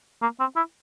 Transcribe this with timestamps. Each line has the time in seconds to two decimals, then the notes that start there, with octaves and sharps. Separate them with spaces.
0.22 A#3
0.40 C4
0.56 E4